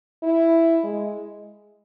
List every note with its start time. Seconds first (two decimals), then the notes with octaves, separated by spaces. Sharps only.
0.23 E4
0.83 G#3